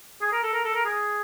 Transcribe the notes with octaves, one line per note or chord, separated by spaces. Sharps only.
G#4
A#4
A4
A#4
A4
A#4
G#4